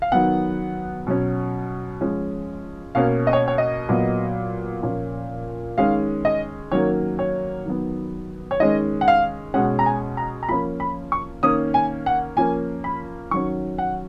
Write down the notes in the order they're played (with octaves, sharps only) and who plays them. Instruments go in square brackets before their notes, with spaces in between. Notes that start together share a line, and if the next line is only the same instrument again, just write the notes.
[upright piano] F5
D#3 F#3 B3 F#5
B2 F#3 C#4
F3 G#3 C#4
B2 A#3 C#4 F5
D#5
C#5
C#5
D#5
A#2 F#3 B3
A#2 F3 A#3 C#4
D#3 G#3 C#4 F5
D#5
D#3 F#3 A#3 C#4 C#5
C#5
D#3 F#3 B3
C#5
D#3 G#3 C#4 D#5
F#5
F5
B2 G#3 C#4 F#5
A#5
G#5
A#5
A#5
F3 A#3 C#4 B5
B5
C#6
D#3 A#3 C#4 D#6
G#5
F#5
F3 A#3 C#4 G#5
B5
D#3 F#3 C#4 C#6
F#5